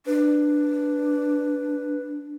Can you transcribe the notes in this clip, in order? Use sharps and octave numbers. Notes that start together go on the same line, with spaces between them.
D4 B4